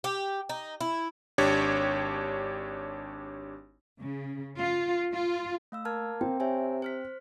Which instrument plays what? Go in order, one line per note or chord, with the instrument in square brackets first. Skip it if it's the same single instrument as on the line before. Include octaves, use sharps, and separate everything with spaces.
[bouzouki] G4
D#4
E4
[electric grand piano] G#1 D4 G4 C#5
[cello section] C#3
F4
F4
[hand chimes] A3 F5 E6
[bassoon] A#3 [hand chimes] A5 F6 G#6
[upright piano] C4 [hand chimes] G5
[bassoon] C3 [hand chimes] C#5 E5 G#5
[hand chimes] C5 F6 B6